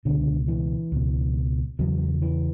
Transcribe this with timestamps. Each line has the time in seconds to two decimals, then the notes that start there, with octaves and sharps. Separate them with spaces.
0.05 C#2 B2 D3
0.48 E3
0.92 C#2 B2
1.79 E2 C#3 F#3
2.22 E3